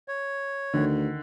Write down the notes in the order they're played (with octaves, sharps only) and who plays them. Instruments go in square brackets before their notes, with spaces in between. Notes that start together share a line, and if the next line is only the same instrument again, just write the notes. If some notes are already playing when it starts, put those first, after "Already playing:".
[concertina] C#5
[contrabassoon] D2 [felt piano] D3 D#3